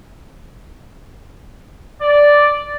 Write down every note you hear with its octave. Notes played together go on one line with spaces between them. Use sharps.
D5